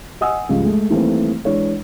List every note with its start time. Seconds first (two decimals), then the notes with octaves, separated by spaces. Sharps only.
0.21 D#5 F#5 G#5 D#6 E6
0.49 C#2 G2 C#3 F3
0.64 G#3 A3
0.90 D#3 E3 G3 A3 A#3 C4
1.45 E3 G#3 D4 C#5